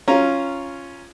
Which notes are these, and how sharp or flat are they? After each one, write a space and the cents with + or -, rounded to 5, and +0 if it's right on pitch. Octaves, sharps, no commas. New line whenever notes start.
C#4 +0 F4 -10 A#5 +0